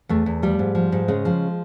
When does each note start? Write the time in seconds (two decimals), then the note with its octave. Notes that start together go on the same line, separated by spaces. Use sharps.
0.09 E2 A3
0.26 E2
0.42 F3 G3
0.59 G#2
0.75 F3
0.92 G#2
1.08 C#3 G#3
1.25 F3